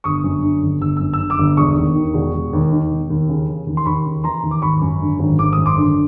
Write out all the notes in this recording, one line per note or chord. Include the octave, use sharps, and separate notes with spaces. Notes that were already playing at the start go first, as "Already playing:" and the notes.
G1 C#6 D#6
F#2
D3
G1
G1 E6
F#2 E6
E6
D3
D6 E6
G1
E1 C#6 D#6
D#2
D#3
E1
E1
D#2
D#3
E1
D#2
C#3
E3
D#2
C6
D#2 B5 C#6
C#3
E3 A#5 C6
D#2
D6
G#1 B5 C#6
F#2
D3
G#1
G#1 D6
F#2 D#6
C6 D6
D3